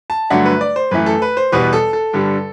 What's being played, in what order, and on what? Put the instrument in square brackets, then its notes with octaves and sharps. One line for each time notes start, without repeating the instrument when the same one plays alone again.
[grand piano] A5
G2 D3 F#3 A3 D4 F#5
B4
D5
C5
F#2 E3 A3 B4
A4
B4
C5
E2 B2 G3 B3 B4
A4
A4
G2 D3 G3